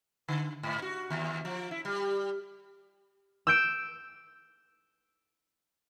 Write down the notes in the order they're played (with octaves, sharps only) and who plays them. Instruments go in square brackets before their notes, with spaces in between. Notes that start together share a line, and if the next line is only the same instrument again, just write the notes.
[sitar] D3
G#2
F#4
D#2
F3
E4
G3
[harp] E6 G6 D7